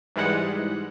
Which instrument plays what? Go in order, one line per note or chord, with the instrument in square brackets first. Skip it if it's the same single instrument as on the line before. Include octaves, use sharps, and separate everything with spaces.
[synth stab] G#2 E3 G3 G#3 F#5